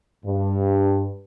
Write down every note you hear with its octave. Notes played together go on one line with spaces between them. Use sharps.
G2